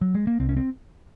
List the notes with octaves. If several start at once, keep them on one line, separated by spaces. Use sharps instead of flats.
F#3
G#3
A#3
C2 C4
C#4
C4